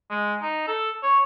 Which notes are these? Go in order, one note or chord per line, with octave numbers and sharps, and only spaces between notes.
G#3
D#4
A4
C#5